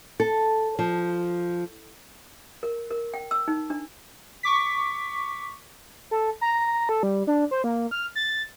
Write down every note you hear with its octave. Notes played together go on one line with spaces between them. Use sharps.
A4
F3
A#4
A#4
G5
E6
D#4
D4
C#6 D6 B6
A4
A#5
A4
G3
D4
C5
A#3
F6
A6